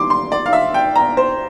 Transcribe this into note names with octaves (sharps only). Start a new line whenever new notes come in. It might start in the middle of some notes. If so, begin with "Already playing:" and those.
Already playing: E3 G3 C6 D6
C6
D5
F5
E5
G5
A#5
C5